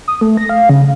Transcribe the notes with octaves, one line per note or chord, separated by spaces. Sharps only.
D#6
A3
A#6
F5
C#3